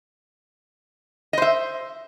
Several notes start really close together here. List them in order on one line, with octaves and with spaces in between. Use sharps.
D#5 C5 E5